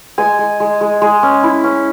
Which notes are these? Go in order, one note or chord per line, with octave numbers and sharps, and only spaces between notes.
G#3 G#5
G#3
G#3
G#3
G#3
C#4
E4
C#4